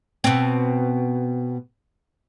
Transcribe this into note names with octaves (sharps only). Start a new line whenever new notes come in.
B2 C4